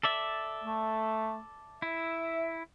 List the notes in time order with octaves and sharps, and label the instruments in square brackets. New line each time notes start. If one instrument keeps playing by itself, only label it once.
[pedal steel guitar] A4 D5 E5
[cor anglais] A3
[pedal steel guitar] E4 [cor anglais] E5